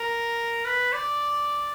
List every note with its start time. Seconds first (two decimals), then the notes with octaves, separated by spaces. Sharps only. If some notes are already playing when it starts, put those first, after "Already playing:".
Already playing: A#4
0.65 B4
0.93 D5